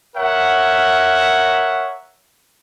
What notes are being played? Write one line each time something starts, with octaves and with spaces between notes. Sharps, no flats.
A#4 C#5 E5 F#5